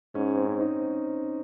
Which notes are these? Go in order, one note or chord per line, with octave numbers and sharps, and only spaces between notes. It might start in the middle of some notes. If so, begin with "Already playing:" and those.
G#2 C#4
C4
C#4
D#4